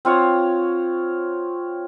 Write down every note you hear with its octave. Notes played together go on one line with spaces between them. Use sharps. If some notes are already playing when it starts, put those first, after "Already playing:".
C4 F4 C#5 F#5